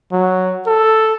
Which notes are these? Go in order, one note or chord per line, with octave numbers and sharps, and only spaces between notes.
F#3
A4